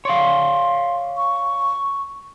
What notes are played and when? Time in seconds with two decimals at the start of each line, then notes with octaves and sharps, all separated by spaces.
0.05 C#5 D5 F5 C6
1.17 C#6